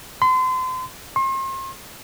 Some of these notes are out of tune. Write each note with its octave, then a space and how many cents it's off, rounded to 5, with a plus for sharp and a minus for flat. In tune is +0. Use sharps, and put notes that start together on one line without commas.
C6 -35
C6 +40